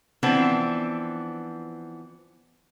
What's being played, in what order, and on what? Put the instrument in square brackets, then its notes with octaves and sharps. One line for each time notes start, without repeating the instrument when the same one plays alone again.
[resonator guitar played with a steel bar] E3 F3 B3 C4 D4